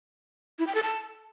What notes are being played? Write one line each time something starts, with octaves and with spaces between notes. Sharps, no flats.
E4
G5
A4
A5